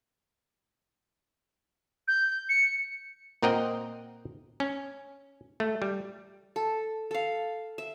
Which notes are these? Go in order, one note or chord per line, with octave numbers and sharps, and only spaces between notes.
G6
C#7
A#2 C4 A#4 D#5 F#5 G5
C#4
A3
G3
A4
A4 F5
E5